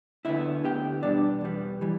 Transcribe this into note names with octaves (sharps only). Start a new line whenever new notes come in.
D2 D3 B3 E4 E5
D2 D3 B3 G4 G5
E2 B2 G3 B3 D4 D5
E2 B2 G3 B3
E3 G3